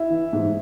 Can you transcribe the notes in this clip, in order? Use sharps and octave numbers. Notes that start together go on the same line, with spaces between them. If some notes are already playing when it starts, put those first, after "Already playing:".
Already playing: E4 E5
E3
G#2